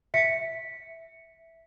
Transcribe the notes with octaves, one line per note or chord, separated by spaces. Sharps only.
E5 B6 C#7